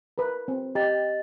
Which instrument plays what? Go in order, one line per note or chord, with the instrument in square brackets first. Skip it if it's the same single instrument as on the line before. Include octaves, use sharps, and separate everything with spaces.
[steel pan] A#4 B4
C4
[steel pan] G4 [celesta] D#5 A6